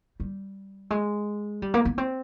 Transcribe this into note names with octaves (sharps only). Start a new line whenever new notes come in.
G3
G#3
G3
A#3
B3
C4